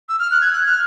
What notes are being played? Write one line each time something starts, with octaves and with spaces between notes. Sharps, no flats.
E6
F6
F#6
G#6
F#6
F6